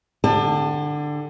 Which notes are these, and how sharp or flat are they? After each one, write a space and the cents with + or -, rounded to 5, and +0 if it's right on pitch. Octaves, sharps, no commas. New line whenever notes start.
D3 +15 G4 +40 A5 +15